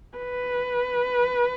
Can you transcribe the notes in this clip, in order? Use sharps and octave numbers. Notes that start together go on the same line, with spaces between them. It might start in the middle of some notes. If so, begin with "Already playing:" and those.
B4